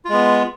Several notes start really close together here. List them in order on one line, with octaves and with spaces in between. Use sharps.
F4 G#3 B3